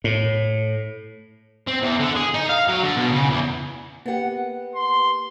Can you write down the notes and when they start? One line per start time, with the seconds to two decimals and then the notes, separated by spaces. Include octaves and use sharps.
0.04 A2
1.67 C4
1.82 E2
2.00 D3
2.16 G#4
2.34 D#4
2.49 F5
2.68 F#3
2.83 D3
2.96 B2
3.12 C#3
3.30 E2
4.06 A#3 B3 G4 F#5
4.75 C6